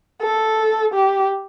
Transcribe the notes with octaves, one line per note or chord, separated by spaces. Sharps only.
A4
G4